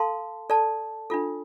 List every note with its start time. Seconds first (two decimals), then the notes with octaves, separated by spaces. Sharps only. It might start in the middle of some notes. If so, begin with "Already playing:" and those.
Already playing: A4 F5 A5 C6
0.50 A4 D5 A5
1.10 D4 F4 A4